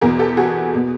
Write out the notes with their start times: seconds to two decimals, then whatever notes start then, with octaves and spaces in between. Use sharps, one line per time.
0.01 E2 B2 G#4 A#4
0.19 G4 A4
0.37 F#4 G#4
0.75 B2